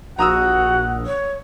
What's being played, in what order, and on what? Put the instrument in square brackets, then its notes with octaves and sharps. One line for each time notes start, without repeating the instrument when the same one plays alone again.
[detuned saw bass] A#1 [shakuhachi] F#4 [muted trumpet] F#5 [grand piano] A#5 D#6 E6
[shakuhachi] C#5